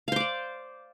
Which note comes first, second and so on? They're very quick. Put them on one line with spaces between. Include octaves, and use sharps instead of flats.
F5 C5 D6 D5